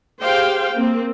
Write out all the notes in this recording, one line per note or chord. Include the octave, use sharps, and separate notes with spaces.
G4 G#4 C5 F5 G5
A#3 C4